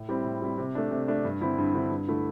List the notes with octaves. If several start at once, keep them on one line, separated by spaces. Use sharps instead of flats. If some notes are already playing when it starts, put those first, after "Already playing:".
Already playing: A2
G3 C4 E4
A2
G3 C4 E4
C3
A3 D4
C3
A3 D4
G2
D3 C4 E4
G2
D3 C4 E4
G2
D3 A3 E4